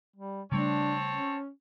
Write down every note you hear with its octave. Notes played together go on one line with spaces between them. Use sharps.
G3
C#3 G3 A3 C4 D4 C#5 A5
C#4